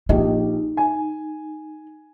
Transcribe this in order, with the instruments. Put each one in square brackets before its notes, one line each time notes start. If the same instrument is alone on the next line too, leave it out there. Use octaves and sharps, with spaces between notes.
[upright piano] A#1 G4 D#5 [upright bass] D#4
[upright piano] G#5